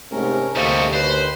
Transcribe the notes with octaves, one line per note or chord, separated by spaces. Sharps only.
G#2 C3 A3 C#4 A#4
D2 C3 G3 A3 A#3 D#5 C#6
D#2 B4 C5 B5